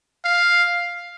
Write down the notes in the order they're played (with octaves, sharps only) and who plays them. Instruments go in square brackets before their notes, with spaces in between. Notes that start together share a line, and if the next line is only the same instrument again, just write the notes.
[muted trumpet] F5